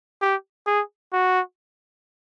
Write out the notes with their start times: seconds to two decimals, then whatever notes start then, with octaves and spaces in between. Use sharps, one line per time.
0.22 G4
0.67 G#4
1.13 F#4